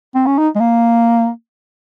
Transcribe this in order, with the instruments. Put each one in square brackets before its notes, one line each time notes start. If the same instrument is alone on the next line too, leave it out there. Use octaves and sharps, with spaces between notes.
[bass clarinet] C4
C#4
D#4
G#3
A#3